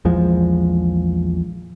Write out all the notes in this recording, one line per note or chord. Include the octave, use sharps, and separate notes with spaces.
A#1 E2 F3 G#3